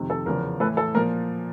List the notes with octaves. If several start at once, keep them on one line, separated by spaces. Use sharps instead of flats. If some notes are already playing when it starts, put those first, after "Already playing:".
Already playing: F2 C3 D#3
A4
E2 C#3 F3 A#4
A2 E3 A4 B4
A4
A#2 F3 A#4